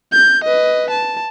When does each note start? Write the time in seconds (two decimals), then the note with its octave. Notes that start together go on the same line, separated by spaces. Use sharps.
0.12 G6
0.44 B4 D#5
0.90 A5